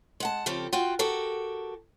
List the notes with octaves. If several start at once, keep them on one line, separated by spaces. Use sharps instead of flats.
G#3 F#5 A5
C#3 F3 C4 G4 A4
F4 F#4 G5
F#4 G4 A4 A#4